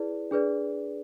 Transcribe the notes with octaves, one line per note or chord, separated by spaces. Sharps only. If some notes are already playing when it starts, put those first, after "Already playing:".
Already playing: E4 G#4 B4 D5
D4 G#4 B4 D5